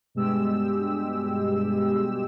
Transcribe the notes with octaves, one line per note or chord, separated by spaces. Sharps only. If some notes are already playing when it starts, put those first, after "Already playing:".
G2 B2 G#3 G4 E6